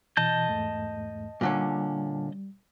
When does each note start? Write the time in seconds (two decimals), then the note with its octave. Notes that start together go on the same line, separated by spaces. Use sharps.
0.17 B2 E3 D#5 A5 G6
0.48 E2 G#2 A3
1.41 A#2 D3 G3 C#4